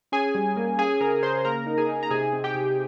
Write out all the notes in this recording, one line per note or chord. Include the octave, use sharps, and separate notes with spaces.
C#4 G#4 G#5
G3
A#3
C#4 G#4 G#5
C#3 A#4 A#5
C#3 C5 C6
A#3 A#4 A#5
D#4
G#4 G#5
D#4
A#5
C3 G#4 G#5
C4
G4 G5
C3